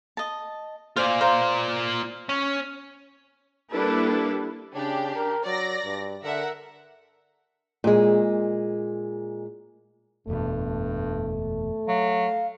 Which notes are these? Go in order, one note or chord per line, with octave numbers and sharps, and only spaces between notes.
D#5 A5
F4 C5 D5 F5 G#5
C5 F5 A#5
C#4
G3 A#3 D4 E4 A4 B4
C#3 D4 G4
A#4
F#3 D5 A#6
G2
D3 A#4 E5 F#5
A#2 G#3
F#1 E2 G2 B2 A3
F#3 F5